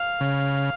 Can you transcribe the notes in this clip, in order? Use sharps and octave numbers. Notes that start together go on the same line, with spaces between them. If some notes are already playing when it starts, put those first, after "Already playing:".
Already playing: F5
C#3